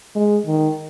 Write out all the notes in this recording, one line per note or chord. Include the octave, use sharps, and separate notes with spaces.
G#3
D#3